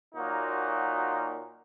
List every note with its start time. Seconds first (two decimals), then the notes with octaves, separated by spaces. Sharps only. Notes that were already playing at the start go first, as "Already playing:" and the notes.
0.14 A#2 F#3 A#3 D#4 F#4